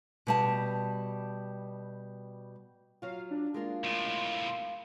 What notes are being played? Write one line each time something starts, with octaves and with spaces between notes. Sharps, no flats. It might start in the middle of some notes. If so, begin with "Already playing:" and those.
B2 G3 A5
F#3 F4 F5
D4
G#3 A#3 F4
B1 A2 C6